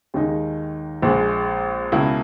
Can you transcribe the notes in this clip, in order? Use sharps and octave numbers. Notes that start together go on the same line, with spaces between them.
D#2 D#3 G#3 D#4
A#1 A#2 G#3
C#2 B2 A#3 E4